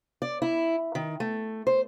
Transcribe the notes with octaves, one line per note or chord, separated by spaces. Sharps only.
D5
E4
D#3
A3
C5